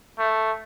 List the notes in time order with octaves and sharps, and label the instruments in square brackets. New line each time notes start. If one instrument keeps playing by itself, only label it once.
[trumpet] A3